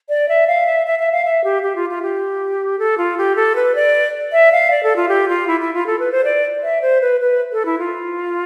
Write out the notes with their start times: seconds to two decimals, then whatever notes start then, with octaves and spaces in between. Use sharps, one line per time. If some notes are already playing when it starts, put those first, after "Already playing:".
0.09 D5
0.29 E5
0.47 F5
0.67 E5
0.86 E5
0.99 E5
1.12 F5
1.25 E5
1.44 G4
1.63 G4
1.76 F4
1.89 F4
2.02 G4
2.79 A4
2.98 F4
3.18 G4
3.36 A4
3.56 B4
3.75 D5
4.32 E5
4.52 F5
4.71 D5
4.83 A4
4.96 F4
5.09 G4
5.29 F4
5.47 E4
5.60 E4
5.74 F4
5.86 A4
5.99 B4
6.12 C5
6.24 D5
6.63 E5
6.82 C5
7.01 B4
7.21 B4
7.52 A4
7.65 E4
7.79 F4